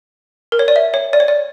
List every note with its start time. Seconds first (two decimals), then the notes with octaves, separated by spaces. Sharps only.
0.52 A#4
0.59 C#5
0.68 D5
0.76 E5
0.94 C#5
1.13 D5
1.20 C#5
1.28 D5